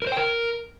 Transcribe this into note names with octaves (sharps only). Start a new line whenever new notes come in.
A#4
C5
G5
A#4